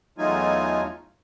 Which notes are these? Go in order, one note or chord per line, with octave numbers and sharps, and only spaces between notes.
E2 F#3 A3 D#4 F4 G#5